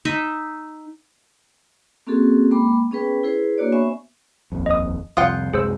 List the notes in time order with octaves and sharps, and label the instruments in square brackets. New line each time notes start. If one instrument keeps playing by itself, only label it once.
[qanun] D#4 D#5 E5
[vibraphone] A#3 C4 C#4 F#4 G#4 A4
G#3 A#3 G5 B5 D6
B3 C#4 G#4 B4 G5
E4 G#4 B4 C5
A#3 D4 F#4 C#5 D5
B3 C5 E5 G#5 C#6
[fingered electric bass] D#1 A#1 F2
[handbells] D#5 D#6
[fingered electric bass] C2 F2 [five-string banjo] F4 F#5 G5 [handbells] D#6
[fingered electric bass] C2 F#2 G#3 [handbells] G#4 C5 E6